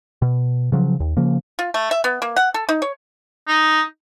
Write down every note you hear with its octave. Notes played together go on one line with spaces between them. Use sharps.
B2
C#3 F3 F#3
D#2
C#3 F3 A#3
F4
A3
E5
B3
A#3
F#5
A4
D#4
C#5
D#4